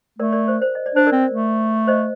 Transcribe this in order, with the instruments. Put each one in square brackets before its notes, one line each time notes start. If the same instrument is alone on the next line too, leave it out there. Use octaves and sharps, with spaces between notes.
[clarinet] A3 [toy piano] A#4 D5
[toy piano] A#4 D5
C5
C5
D#5
D5
[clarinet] D4 [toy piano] C5
[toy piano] A#4 D5
[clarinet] C4
A3
[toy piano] C5 D#5